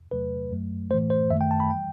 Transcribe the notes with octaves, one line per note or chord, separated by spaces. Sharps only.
E2 C3 F#3 A3 B4
F#2 F#3 A3
A2 E3 A3 C5
C5
F#2 D#3 A3 E5
G5
A5
B5
E3 G3 G5